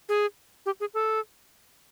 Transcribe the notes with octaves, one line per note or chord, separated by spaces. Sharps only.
G#4
G4
G#4
A4